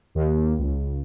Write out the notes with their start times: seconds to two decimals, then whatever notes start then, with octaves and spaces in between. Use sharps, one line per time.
0.15 D#2
0.58 C#2